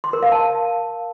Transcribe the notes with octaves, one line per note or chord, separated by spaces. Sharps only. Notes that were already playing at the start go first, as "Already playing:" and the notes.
C6
A#4
F5
A5